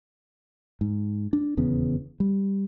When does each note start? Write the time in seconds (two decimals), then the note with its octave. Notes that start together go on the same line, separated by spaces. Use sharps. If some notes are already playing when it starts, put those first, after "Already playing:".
0.81 G#2
1.33 D4
1.57 D#1 E2 C#3 B3
2.20 G3